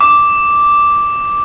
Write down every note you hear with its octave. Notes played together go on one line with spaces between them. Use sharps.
D6